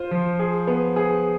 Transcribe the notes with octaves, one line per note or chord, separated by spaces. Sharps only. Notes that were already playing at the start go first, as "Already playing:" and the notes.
Already playing: F4 C5
F3
G#4
B3
G#4